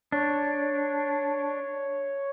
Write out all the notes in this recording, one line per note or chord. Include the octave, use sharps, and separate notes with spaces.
D4 C#5